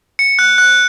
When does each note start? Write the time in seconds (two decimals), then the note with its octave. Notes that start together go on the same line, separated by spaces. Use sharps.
0.19 C#7
0.39 F#6
0.58 F#6